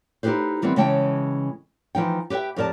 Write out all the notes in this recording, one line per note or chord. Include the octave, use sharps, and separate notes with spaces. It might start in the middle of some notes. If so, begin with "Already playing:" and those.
D#4 E4 G4 G#4 B4 C5
D#3 E3 G3 B3 C4
C#3 E3 G#3 C#4 G5 A5
E3 F3 D#4 G5
G4 B4 C#5 E5 G5
F2 G4 A#4 D5 A5